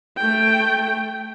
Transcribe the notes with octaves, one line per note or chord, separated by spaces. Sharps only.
A3 G5